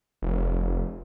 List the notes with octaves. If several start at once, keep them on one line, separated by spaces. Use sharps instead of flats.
F1